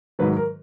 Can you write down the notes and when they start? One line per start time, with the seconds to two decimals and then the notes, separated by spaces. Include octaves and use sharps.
0.19 G#2 D#3 F#3 B4
0.37 A#4